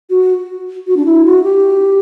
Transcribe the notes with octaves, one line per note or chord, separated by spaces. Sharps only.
F#4
F#4
D4
E4
F#4
G4